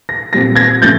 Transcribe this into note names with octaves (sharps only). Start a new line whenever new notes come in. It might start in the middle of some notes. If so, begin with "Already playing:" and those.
A#6
A#2 G3 C4 A#6
G#6 A#6
C#3 F3 A3 G6 A6